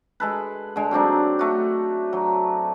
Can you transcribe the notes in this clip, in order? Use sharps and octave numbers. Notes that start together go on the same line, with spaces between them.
G#3 A4 B4
D3 G#3
F#3 C4 D4 D#4
A3 F#4
F#3